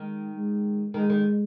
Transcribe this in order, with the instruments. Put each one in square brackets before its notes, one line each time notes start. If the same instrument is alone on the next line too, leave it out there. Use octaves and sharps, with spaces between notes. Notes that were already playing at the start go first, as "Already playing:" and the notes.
Already playing: [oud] D#3 [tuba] G#3
[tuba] G#3
[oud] D#3 [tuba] G#3
[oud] D#3